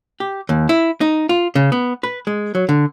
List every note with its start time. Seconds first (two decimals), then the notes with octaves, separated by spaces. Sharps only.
0.20 G4
0.49 D#2
0.69 E4
1.01 D#4
1.29 F4
1.55 C#3
1.72 B3
2.03 B4
2.27 G#3
2.55 F#3
2.69 D3